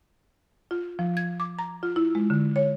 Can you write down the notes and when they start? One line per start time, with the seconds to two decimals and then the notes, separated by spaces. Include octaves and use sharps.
0.71 F4
0.99 F3
1.17 G#6
1.40 D6
1.59 A#5
1.83 F4
1.96 E4
2.15 G#3
2.30 D3
2.56 C#5